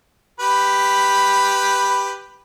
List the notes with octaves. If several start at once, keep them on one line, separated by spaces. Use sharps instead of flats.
G4 B4 B5